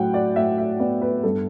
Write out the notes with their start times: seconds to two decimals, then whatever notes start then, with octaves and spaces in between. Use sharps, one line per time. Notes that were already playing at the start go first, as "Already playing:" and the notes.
Already playing: A2 F#3 F#5 G5
0.14 D5
0.36 A2 E5
0.58 E5
0.80 B3 D5
1.02 B4
1.23 G2 A4